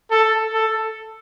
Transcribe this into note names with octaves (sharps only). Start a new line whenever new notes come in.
A4
A4